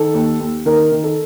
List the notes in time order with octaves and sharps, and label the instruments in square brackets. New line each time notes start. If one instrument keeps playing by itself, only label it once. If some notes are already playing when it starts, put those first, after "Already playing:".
Already playing: [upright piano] D#3 A4
D#2
D#2
D#3 A#4
D#3
A4